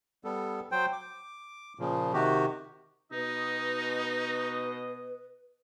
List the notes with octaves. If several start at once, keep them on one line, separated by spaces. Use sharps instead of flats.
G3 B3 A4
F#3 C5 G5
D6
A#2 C#3 F3
C3 D#3 F#4 G4
B2 D#4 B4 D#5